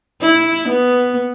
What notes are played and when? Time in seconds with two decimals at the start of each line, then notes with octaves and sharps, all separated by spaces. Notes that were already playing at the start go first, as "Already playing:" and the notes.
0.22 E4
0.69 B3